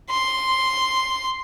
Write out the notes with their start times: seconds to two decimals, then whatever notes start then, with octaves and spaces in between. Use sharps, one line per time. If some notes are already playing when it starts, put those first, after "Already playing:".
0.10 C6